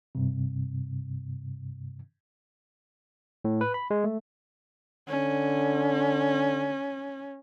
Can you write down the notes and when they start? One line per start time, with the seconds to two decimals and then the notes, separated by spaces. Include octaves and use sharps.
0.15 G2 C3
3.45 A2
3.61 B4
3.74 B5
3.91 G#3
4.04 A3
5.09 D3 C#4